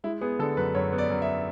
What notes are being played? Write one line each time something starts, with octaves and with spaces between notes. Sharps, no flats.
G#3 E4
B3 G#4
D3 A4
F#2 B4
F#2 C#5
B3
D5
F#2
E5